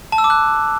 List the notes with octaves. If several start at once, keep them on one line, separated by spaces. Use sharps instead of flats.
A5
E6
D6
F#6